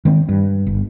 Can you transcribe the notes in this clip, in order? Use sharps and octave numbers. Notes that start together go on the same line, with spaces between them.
D#3 G#3 C4
G2
G1